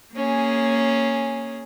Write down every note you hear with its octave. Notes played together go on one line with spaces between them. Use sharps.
A#3 C#4 G#4